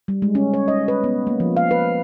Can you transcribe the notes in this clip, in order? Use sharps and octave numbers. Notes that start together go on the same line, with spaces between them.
G3
G#3
C#4
C#5
D#5
B4
B3
A#3
F3
F5
B4